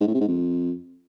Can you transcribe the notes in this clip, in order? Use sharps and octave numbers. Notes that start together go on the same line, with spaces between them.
G#2
A2
C3
G#2
F2